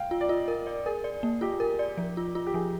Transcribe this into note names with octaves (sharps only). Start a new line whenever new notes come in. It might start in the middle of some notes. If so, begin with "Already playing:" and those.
Already playing: F5 G5
F4
D5
F4 D#5
A#4
D5
G#4 A#4
D5
A#3
F4 G4
A#4
D5
F3
F4
F4
G4
F3 G#4